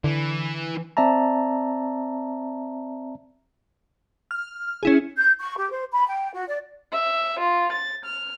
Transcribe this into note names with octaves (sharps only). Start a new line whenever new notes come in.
D3 E3
C4 D5 E5 A5 A#5
F6
C#4 E4 G#4
G6
C#6
G4
C5
B5
G5
F#4
D5
E5
F4
A6
F6